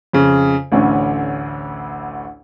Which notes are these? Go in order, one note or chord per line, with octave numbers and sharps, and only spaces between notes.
F2 C#3
A1 D2 D3 C#4